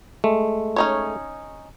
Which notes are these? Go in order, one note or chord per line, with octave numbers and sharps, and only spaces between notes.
G#3 A3
C#4 D#4 C#5